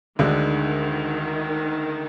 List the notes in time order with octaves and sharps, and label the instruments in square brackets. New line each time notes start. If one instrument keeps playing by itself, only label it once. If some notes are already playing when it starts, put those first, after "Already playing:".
[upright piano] D2 D3 G#3 D4 [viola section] D#3